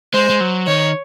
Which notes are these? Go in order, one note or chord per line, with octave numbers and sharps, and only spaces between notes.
G#3 C5
G#3
F#3
D#3 C#5